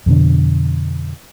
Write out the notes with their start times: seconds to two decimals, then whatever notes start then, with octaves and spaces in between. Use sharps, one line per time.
0.06 F2 B2 D3